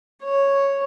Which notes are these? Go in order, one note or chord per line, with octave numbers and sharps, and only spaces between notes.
C#5